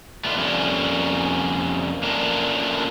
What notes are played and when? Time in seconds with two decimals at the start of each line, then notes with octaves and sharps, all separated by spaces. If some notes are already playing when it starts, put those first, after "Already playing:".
0.24 A3 B3 D4 E4 F4
0.37 F2 G3 A#3 C#4
2.03 A3 A#3 C#4 D4 F4 A#4